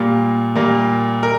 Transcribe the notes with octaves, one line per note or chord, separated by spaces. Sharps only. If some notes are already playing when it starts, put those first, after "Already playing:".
Already playing: A#2 G3 A#3
A#2 G3 A#3
A#4